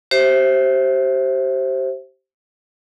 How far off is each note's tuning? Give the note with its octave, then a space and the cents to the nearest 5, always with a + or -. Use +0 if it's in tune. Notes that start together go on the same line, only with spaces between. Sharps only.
G4 -30 C5 +15 E5 +0